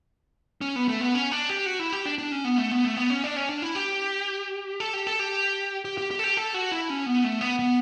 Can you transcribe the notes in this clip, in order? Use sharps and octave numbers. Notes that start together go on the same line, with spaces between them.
C#4
B3
A3
B3
C#4
D4
G4
F#4
E4
G4
D4
D4
C#4
B3
A3
B3
A3
B3
C#4
D4
C#4
D4
E4
G4
A4
G4
A4
G4
G4
G4
G4
A4
G4
A4
F#4
E4
C#4
B3
A3
B3
B3